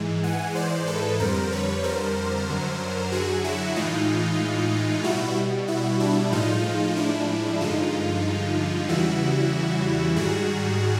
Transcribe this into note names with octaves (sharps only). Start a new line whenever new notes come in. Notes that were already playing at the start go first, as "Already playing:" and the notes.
Already playing: G#2 E3 G#3
F#5 G#5
C5 D5
A4 B4
F2 D3 G3 A#4 C5
B4 C#5
A#4 C5
F#2 D3 F#3
F#4 G#4
E4 F#4
A2 E3 G#3 D#4 F4
B2 G3 E4 F#4
E4 F#4
D4 E4
A2 F3 G#3 D#4 F4
D4 E4
G2 D3 F3 G#3 D#4 F4
E2 C#3 E3 G3 E4 F#4
G#2 D#3 G3 F#4 G#4